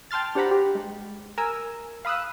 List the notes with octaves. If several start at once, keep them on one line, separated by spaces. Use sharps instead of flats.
G5 A5 C6 F6 A6
D4 G4 C5 F#5 A#5 B5
G4
G#3
A#4 G#5 E6
F5 B5 D#6 E6 F#6